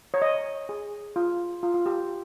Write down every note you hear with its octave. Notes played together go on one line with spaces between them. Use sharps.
C#5
D#5
G#4
F4
F4
F4
G4